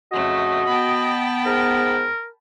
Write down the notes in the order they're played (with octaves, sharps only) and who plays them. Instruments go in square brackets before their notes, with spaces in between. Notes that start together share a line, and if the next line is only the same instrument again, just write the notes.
[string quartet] F2 C#3 A3 [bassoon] F#4 [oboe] D#5
[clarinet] B3 [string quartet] G5 A5 B5
[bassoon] G#2 [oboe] A#4